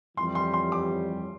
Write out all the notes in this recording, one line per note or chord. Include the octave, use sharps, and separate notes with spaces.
F2 E3 G3 C6
C6
C6
D6